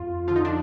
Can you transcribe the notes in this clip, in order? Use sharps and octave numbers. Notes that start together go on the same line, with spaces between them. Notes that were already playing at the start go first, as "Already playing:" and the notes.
Already playing: F2 F4
D3 F3 F4
D#4
D4